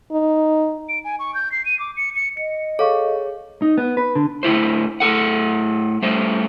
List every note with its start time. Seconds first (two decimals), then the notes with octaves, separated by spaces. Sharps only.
0.12 D#4
0.89 D7
1.04 G#5
1.19 C#6
1.34 G6
1.52 C7
1.66 D#7
1.79 D6
1.97 C#7
2.16 C#7
2.37 D#5 C#7
2.79 G#4 A4 C#5 F5 C#6
3.62 D#4
3.78 B3
3.97 B4
4.15 D3
4.43 A2 D3 E4 C5
5.00 A2 A4 F#5
6.02 G3 A3 C5